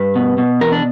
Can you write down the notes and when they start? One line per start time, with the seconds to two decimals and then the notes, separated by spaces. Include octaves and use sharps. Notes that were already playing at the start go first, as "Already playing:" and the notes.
Already playing: G2 B4
0.15 B2
0.38 B2
0.61 E2 A#4
0.72 D4